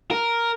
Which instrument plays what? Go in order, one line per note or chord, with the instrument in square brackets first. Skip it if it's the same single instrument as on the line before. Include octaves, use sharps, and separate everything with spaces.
[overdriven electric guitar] A#4